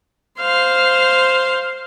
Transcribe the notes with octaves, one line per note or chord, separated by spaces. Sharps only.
C5 F5